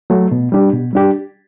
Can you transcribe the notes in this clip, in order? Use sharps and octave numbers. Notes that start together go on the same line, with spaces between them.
F#3 A3
B2
G3 D4 G4
B2
G3 D4 G4